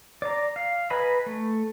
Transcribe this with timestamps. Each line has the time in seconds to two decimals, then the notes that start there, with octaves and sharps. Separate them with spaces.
0.22 D5 A#5
0.56 F5
0.90 B4 D#5 G#5 A#5 B5
1.26 A3